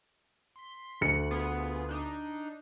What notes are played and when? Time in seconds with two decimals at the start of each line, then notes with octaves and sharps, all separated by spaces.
0.56 C6 B6
1.01 D2 A3 F#6 C#7
1.31 B3 F4 G#4
1.89 D4 D#4